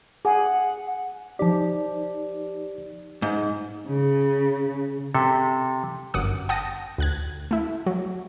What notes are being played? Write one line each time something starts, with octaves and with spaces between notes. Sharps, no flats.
G#4 F#5
F3 D#4 G4 D5
G#2
C#3
C3 A4
G1 F#2 F#5 D6 D#6
F#5 G5 A5 D#6 A#6
D2 F#6 G#6
A3 E4
F#3